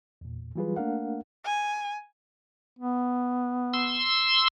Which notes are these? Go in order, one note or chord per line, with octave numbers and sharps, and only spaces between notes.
E2 A#2
E3 F#3 G3 F4 G#4 B4
A3 A#3 D4 A#4 F5 F#5
G#5
B3
C6 E6